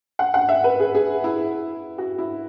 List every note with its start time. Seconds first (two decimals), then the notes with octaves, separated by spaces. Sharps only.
0.19 F#5
0.34 F#5
0.49 E5
0.64 B4
0.80 G#4
0.95 G#4
1.24 E4
1.98 F#4
2.18 E4